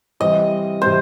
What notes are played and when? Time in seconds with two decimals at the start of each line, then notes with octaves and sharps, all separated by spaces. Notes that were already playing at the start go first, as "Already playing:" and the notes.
0.20 C3 E3 G3 C4 D#5
0.81 C3 E3 G3 C4 C5